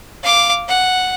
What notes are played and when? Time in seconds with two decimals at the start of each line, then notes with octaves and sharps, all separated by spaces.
0.23 F5 D6
0.68 F#5